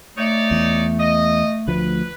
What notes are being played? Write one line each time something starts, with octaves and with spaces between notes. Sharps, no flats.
A3 D#4 C#5 D5
E2
D#5
D2 F3 B4